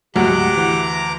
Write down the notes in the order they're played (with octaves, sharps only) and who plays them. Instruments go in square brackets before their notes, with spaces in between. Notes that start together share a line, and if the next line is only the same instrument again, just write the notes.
[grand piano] D2 [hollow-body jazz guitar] G#2 F#3 [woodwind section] G4 F#5 [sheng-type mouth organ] A#5 D6
[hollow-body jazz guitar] E3